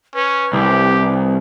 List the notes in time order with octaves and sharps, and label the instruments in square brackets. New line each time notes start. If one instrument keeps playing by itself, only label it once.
[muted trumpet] C#4 [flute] B4
[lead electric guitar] C2 [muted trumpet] G4